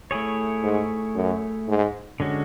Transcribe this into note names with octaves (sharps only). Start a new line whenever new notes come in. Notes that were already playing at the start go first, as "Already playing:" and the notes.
A3 E4 G#4 C#5
G#2
F#2
G#2
D3 G#3 C#4 F#4